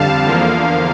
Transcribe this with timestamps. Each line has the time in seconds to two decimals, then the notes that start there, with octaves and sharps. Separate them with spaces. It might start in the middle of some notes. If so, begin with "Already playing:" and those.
Already playing: F2 D3 G3 F5 A5
0.26 E2 D3 F3 A#3